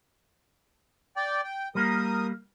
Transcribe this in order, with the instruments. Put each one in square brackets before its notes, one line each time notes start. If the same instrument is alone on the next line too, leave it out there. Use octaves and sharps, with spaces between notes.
[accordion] D5 G5
G5
[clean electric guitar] G3 A#3 [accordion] A#4 D#6